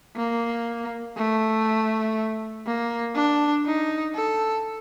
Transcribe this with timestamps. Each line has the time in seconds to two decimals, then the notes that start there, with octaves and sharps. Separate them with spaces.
0.16 A#3
1.16 A3
2.66 A#3
3.15 D4
3.66 D#4
4.15 A4